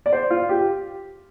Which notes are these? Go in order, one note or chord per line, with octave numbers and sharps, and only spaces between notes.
D5
C5
F4
G4